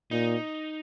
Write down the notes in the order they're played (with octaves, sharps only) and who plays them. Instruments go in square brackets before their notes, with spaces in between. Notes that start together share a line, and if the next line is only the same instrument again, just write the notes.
[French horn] A#2 [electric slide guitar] D#4